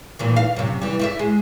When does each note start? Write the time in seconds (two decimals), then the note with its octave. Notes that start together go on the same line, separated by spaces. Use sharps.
0.19 A#2 D#3 E3
0.36 F5
0.56 F#2 C3
0.82 E3 G3
0.99 E4 F4 E5
1.19 G#3